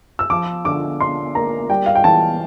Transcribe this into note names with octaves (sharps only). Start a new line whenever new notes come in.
E6
F3 D6
D3 D6
D4 C6
A#3 A#5
G3 G5
F5
G5
E3 A5